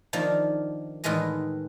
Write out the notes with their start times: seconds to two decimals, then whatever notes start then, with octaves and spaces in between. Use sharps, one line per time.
0.13 D#3 F3 A#3 D4
1.04 A2 D#3 E3 G#3 D#5